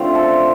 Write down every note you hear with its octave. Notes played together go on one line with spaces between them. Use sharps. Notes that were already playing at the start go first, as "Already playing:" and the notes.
Already playing: D3 A3 C4 F4
A4